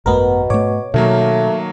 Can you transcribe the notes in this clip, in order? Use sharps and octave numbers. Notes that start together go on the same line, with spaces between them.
G#1 F#2 B2 A3 B3 A#4
G#2 A3 C#5 D6
B2 D#3 F#3 A3 A#3